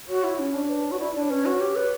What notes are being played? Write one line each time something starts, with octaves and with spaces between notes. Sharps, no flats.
F#4 C#5
E4
C#4
D4
B4
C#5
F#4
E4 D5
D4 D5
C#5
C#4 B4
F#4 C#5
G4
B4